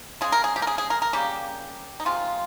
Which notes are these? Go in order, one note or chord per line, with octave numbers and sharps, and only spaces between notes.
C#3 G#3 G#4
A#4
G#4
G4
A#4
G#4
G#4
A#4
A#4
C#3 G3 A#3 G4
D#4
C3 D#3 G#3 F4